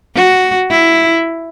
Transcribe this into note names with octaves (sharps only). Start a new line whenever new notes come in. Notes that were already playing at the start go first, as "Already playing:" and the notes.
F#4
E4